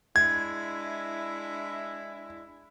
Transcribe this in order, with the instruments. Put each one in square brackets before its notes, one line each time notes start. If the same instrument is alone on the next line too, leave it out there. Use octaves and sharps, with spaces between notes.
[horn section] G#3 D4 E4 [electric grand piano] G#6